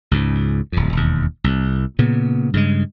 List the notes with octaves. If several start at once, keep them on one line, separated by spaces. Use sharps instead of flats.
C#2 G#2
D1 F2
E1 D#2
C2
A#2 C#3 B3
G2 C#3 G#3